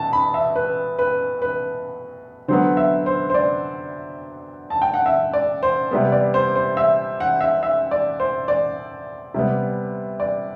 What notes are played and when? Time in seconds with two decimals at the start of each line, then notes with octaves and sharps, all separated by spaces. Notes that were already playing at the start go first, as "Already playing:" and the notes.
Already playing: B2 A5
0.13 B5
0.34 E5
0.56 B4
0.99 B4
1.42 B4
2.48 D3 F#3 B3 C5
2.77 E5
3.06 C5
3.30 C5
3.34 D5
4.70 A5
4.82 G5
4.94 F#5
5.06 E5
5.33 D5
5.63 C5
5.91 C3 G3 B3
6.12 D5
6.34 C5
6.56 C5
6.77 E5
7.20 F#5
7.41 E5
7.63 E5
7.91 D5
8.20 C5
8.48 D5
9.34 C3 G3 B3
10.20 D5